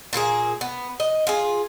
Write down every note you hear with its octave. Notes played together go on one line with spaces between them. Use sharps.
A#2 A#3 E4 G#4
B3
D#5
F4 G#4